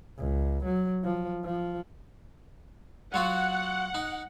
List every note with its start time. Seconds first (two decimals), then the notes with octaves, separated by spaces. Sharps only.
0.18 C#2
0.65 F#3
1.04 F3
1.45 F3
3.14 F#3 F4 F#4 F#5
3.95 D#4